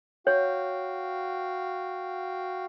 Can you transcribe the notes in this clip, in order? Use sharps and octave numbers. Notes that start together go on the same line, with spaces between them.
F#4 C#5 F5 G5